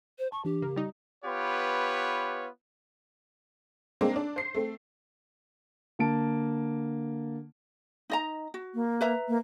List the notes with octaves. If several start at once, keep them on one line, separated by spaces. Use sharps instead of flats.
C5
A5 C#6
E3 D4 G4
C#3 A#3
G3 D#4
B3 F4 G4 B4 C#5
G#3 A#3 C4 D4
D4
C5 C7
A3 C4
D3 A#3 A5 D7
D#4 D#5 A#5
F#4
A#3
B4 E5 A#5
A#3